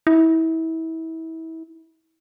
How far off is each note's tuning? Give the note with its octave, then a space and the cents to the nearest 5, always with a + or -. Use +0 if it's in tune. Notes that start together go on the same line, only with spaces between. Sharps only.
E4 -30